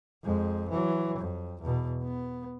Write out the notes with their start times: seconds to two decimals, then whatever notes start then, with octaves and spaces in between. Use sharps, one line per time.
0.24 F2 G#3
0.70 E3 F#3
1.19 F2
1.61 E2 B2
2.02 B3